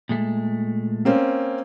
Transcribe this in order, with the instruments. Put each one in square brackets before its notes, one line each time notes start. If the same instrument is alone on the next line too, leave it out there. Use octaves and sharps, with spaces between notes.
[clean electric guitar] A#2 G#3 A3
[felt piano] A#3 C4 C#4